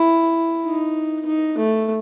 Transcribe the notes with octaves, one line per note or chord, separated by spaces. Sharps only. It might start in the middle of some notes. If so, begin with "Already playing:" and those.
Already playing: E4
D#4
D#4
A3